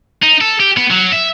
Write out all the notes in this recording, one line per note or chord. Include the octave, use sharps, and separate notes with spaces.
D#4
A4
G4
B3
F#3
E5